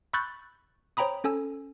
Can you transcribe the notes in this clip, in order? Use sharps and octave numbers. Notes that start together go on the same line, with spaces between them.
B5 C#6 E6 F#6 G6 A6
C5 C#5 G5 A#5 B5 D#6
C#4 A4 G#5 E6